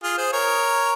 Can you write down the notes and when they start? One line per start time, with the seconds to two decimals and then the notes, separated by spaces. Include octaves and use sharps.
0.03 F4 G#4
0.17 G#4 C5
0.32 A#4 C#5